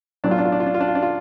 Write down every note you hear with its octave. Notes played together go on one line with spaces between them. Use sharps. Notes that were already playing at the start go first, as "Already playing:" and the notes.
B1 A2 F#3 D4
F4
D4
F4
D4
F4
D4
F4
D4
F4
D4
F4